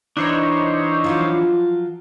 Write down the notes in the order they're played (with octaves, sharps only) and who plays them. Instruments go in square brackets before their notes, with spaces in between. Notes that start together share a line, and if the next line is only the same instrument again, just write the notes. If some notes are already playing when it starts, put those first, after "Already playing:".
[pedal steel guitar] E3 D4 [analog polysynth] D#4 C5 C#5
[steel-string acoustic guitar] F3 F#3 F4